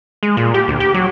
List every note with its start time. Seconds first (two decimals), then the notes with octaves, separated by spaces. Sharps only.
0.23 G#3
0.37 A#2
0.54 G4
0.68 D2
0.80 G4
0.94 F#3